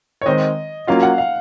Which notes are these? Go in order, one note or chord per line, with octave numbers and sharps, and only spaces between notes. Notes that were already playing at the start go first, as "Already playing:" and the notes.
C#5
D#3 G#3 C4 D#5
F#3 A#3 C#4 F4 F5
F#5
F5